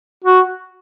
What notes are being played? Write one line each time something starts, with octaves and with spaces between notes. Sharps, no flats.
F#4